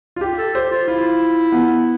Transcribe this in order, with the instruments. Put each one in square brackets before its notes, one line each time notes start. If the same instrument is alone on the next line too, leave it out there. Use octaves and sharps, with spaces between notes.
[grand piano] F4
G4
[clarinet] A4
[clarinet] G4 [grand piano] C5
[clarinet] F4
[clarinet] E4 [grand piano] F4
[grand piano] B3